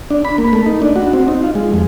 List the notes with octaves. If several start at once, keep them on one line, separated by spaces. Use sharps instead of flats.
D4
B5
A#3
A3
D#4
D4
F#4
C4
D#4
F4
G#3
F2